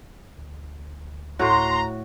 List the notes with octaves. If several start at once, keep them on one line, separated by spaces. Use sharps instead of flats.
D2
A2 F#4 A#5 C6